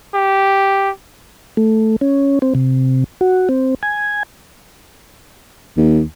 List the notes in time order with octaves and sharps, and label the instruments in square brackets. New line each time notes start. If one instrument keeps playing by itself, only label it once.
[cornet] G4
[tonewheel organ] A3
C#4
C4
C3
F#4
C4
G#5
[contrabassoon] D#2